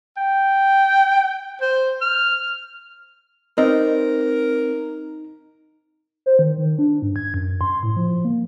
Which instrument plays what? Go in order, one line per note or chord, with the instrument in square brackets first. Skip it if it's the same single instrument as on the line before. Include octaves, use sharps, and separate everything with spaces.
[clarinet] G5
C5
F6
[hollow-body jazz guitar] C4 [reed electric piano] D#4 [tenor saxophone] A#4 [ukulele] B4 D5 D#5
[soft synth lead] C5
D#3
D#3
D4
G2
G#6
F#2
C6
A2
F3
A#3